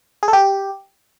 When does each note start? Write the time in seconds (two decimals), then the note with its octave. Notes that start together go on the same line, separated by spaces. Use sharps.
0.23 G#4
0.28 A4
0.33 G4